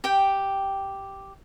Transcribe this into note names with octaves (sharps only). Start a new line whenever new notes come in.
G4 G5